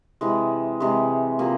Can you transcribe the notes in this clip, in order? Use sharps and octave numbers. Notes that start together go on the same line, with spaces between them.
C3 E3 G#3
C3 E3 G#3
C3 F3 A#3